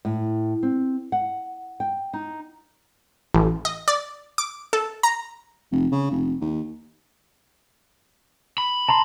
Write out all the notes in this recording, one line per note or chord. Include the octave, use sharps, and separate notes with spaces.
A2
C4
F#5
G5
D#4
A1
D#5
D5
D6
A4
A#5
F1
C#3
F1
D#2
B5
A5 A#5 C6